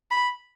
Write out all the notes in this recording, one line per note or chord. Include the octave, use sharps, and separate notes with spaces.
B5